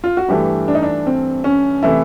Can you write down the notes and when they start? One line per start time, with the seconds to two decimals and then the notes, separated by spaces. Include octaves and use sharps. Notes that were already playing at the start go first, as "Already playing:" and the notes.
0.04 F4
0.17 F#4
0.28 G2 E3 A3 G4
0.68 D4
0.75 D#4
0.83 D4
1.07 C4
1.44 C#4
1.83 C3 E3 A3 E4